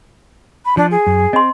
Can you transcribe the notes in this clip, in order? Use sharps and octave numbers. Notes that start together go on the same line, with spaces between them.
B5
F3 D4
G#4
F#2
C4 D#5 C6